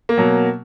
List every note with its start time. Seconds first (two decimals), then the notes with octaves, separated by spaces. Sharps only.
0.09 A#3
0.18 B2 F#3